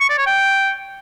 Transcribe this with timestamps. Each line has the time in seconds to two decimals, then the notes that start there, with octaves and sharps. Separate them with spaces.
0.01 C#6
0.09 D5
0.18 C#5
0.26 G5